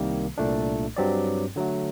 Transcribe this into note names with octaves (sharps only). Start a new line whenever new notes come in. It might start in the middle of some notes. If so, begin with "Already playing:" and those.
Already playing: C2 C3 D#3 G3 A#3
C2 A#2 A3 D4
G2 F#3 C4 G4 D5
D3 F#3 A3